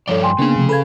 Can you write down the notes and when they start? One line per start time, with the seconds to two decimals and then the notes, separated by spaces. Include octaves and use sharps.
0.08 G2 F3 A4 C#5 D5 G7
0.23 G5 G#5 C6
0.38 C#3 A#3 B3 D4 G#4
0.56 C3 F3 A3
0.69 A4 B4 F5 B5 G#6